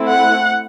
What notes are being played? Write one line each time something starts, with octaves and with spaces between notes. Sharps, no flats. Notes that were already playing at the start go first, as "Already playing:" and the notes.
Already playing: A3 C4 E4
F#5